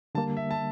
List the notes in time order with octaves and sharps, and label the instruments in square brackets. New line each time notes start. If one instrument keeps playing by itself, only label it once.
[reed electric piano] D3 G3 A#3 [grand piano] A5
[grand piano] E5
A5